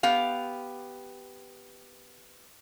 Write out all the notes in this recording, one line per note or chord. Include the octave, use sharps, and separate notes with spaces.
B3 G4 F5